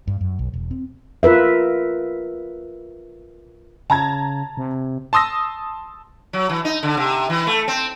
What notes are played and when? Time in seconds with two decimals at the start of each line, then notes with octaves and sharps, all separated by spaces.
0.07 G2
0.21 F#2
0.39 B1
0.53 E1
0.71 C4
1.23 F4 A#4 B4 E5
3.90 C#3 A5 A#5 G#6
4.57 C3
5.13 A5 C6 D#6 E6 A#6
6.33 F#3
6.49 E3
6.65 D#4
6.83 D3
6.97 C3
7.30 E3
7.47 A3
7.68 C4